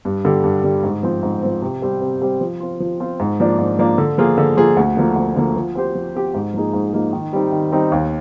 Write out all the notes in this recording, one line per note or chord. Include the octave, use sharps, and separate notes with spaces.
G2
D3 G3
G2
D3 G3
G#2
F3 C4
G#2
F3 C4
C3
G3 C4 G4 C5
C3
G3 C4 G4 C5
F3
C4 F4
F3
C4 F4
G#2
F3 A#3 D4
G#2
F3 A#3 D4
D3
F3 A#3 F4 G#4
D3
F3 A#3 F4 G#4
D2
D3 F3 A#3
D2
D3 F3 A#3
F3
C4 G4 C5
F3
C4 G4 C5
G#2
F3 A#3 D#4 G#4
G#2
F3 A#3 D#4 G#4
D#3
G3 C4 D#4
D#3
G3 C4 D#4
D#2